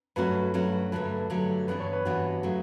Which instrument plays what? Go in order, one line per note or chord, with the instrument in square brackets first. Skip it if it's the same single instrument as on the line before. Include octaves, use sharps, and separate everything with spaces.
[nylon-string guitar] G2 F#3 A3 C#4 F#4 [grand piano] B4
[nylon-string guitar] G2 F#3 A3 C#4 F#4
[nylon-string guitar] G2 D3 F#3 A3 [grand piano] B4
[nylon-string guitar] G2 D3 F#3 A3
[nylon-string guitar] G2 E3 B3 D4 [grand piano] B4
[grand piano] C#5
B4
[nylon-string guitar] G2 E3 B3 D4 [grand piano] F#4
[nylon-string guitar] C#3 F#3 A3